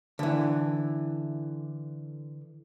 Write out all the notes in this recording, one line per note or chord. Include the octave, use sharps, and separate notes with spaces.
D3 E3